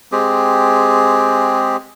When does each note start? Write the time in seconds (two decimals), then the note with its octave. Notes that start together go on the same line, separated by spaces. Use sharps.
0.12 G#3 C4 G4 G#4